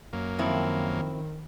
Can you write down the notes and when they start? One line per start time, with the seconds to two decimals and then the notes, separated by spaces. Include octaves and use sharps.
0.13 F#2 A#3
0.39 F2 D#3 C4 E4